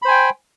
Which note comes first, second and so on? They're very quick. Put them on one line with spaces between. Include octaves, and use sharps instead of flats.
B5 C5 G#5 G5